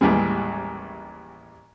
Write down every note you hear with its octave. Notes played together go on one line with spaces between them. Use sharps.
A1 D#2 E3 G3 G#3